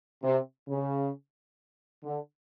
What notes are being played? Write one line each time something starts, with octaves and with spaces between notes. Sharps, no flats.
C3
C#3
D3